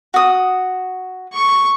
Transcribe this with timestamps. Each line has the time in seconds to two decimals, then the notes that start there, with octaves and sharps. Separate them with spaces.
0.14 F#4 D#6
1.33 C#6